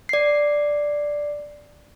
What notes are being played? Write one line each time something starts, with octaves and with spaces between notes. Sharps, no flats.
D5 C7